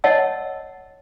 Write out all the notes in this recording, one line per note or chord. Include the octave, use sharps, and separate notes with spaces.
C#5 D#5 F#5 A5 E6